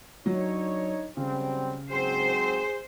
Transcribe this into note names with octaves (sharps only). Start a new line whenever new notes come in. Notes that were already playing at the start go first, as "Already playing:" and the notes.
F#3 D4 D#4 C#5
C#3 F#3 G3 C4
G#2 F#3 C4 G#4 C5